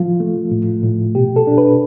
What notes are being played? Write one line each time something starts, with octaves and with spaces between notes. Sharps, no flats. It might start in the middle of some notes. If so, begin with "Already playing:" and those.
Already playing: F3 F4
A3
A2
A2
B2 G4
A4
D4
B4